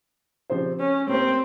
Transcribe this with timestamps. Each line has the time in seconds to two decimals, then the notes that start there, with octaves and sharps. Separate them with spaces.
0.50 C#3 F3 C4 G4 C5
0.80 C#4
1.09 A#3 C4 C#4 G4 C5